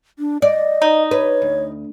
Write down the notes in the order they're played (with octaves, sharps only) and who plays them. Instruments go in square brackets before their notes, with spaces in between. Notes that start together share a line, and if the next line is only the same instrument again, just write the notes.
[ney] D4
[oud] D5 [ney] D#5
[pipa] D#4
[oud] B4 [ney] C#5
[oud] D2